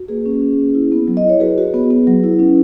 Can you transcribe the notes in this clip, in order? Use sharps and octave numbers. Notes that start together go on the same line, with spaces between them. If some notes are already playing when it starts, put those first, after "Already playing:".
Already playing: F#4
A#3 G#4 B4
C#4
C#4
A#3
E4
B3
F#3
D#5
E4
C#5
F#4 G#4 B4
F#4
B3
B3
F#3
E4
C#4